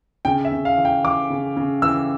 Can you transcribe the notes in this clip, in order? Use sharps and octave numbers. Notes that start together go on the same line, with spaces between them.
C#3 G5
E5
C#3
F5
E3
G5
E3 D6
C#3
C#3
E3 E6